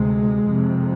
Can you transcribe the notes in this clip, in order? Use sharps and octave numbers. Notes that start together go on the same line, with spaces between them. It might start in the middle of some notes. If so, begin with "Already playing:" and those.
Already playing: D2 C3 G#3
F2 C3